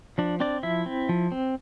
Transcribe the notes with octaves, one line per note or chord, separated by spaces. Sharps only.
F3 D4 D5
C4 D4 D5
F3 E4 E5
C4
F3
C4